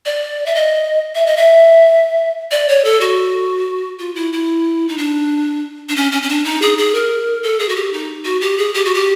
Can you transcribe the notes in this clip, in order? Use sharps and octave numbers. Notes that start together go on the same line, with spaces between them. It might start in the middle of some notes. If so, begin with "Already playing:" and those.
D5
E5
D#5
E5
D#5
E5
D5
C#5
A4
F#4
F4
E4
E4
D#4
D4
D4
C#4
C#4
C#4
D4
D#4
G#4
G#4
A#4
A4
G#4
F#4
G4
D#4
F#4
G4
G#4
G4
F#4
G4